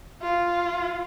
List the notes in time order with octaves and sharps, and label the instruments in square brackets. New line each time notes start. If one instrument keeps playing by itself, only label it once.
[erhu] F4